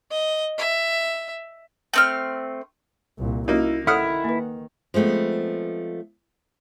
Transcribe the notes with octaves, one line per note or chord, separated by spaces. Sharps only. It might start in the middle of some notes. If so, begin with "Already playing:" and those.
D#5
E5
A3 C4 F6
C2 A#2
A#3 C#4 D#4 E4 F#4
D#3 E4 A4 F#5 D#6 F6
A#3 B4
F3 G#3 A3 B3 C4